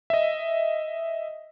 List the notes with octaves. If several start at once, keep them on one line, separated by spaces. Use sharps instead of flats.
D#5 E5